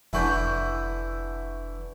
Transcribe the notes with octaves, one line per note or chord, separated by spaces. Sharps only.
F1 D3 E3 B4 E5 C#6 G6